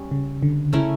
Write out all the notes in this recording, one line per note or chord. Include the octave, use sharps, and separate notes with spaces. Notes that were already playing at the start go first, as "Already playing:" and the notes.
Already playing: G3 C#4
C#3
D3
C#3 A3 C#4 E4 A#4